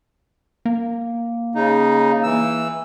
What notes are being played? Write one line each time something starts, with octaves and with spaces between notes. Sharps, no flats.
A#3
C#3 D#4
E3 E6